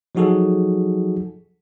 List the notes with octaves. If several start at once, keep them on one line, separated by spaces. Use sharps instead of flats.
F3 F#3 D#4 F#4 G#4 A4